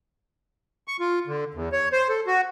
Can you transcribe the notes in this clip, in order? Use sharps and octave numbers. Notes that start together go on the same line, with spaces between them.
C#6
F4
D3
E2
C#5
C5
A4
F#4